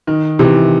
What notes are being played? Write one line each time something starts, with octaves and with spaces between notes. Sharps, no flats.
D#3
C3 E3